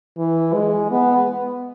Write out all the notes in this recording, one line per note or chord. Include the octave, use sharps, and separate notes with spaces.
E3
G#3
B3